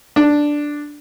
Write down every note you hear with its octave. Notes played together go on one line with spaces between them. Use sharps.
D4